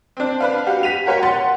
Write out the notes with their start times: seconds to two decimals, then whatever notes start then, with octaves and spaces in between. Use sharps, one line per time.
0.17 C4 D4
0.40 D4 B4 F5
0.66 F#4 G4 F5
0.83 G4 B6 D#7 F7
1.06 F#4 A#4 C#5 F5 G5
1.23 F#5 C6 A6